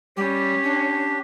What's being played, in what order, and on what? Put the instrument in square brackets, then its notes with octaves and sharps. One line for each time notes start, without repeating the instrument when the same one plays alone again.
[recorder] G3 [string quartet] C#4 [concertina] G4
[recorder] D4